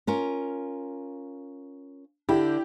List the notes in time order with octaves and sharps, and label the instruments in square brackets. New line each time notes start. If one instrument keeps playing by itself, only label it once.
[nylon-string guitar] C#4 F4 A#4
[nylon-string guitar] D3 [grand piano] E4 [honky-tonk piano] G4